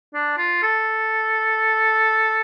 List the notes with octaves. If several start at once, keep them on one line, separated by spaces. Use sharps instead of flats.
D4
F4
A4